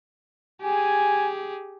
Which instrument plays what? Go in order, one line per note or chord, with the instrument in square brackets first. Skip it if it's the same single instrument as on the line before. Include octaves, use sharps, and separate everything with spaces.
[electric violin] G4 G#4 [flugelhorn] G#5